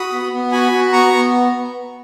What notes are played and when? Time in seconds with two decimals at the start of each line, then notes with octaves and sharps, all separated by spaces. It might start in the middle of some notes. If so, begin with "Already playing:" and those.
Already playing: F#4 B5 D#6
0.12 B3
0.32 B3
0.52 F#4 G#5 B5
0.72 F#4
0.92 B3 A#5 C#6
1.13 B3